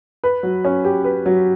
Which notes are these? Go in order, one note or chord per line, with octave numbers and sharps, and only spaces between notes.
B4
F#3
C#4
G4
B4
F#3